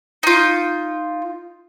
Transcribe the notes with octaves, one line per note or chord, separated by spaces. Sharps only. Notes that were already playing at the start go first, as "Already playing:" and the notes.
D#4 F4